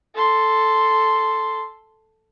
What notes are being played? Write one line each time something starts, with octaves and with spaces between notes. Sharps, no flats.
A4 C6